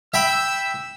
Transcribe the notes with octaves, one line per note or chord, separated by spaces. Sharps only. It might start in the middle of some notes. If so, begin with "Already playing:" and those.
E5 G5 B5 E6